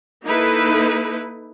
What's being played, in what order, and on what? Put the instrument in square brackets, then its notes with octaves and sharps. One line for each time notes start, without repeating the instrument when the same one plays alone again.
[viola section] A#3 D#4 E4 A4 B4